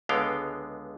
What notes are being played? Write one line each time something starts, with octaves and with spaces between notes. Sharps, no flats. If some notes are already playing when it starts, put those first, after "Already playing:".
C#2 D3 G#3 B3 F5 G5